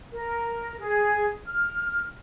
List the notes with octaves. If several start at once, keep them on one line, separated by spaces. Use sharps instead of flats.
A#4
G#4
F6